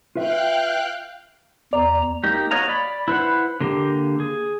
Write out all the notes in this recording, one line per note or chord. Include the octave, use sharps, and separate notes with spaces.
F4 B4 E5 F5 G5 F#6
E2 D5 A#5
A#3 D#4 G4
F#4 C#5 D#5 F5 A#5
D5 B5
E4 B4 C5 F#5
D3 A#3 G4
G#4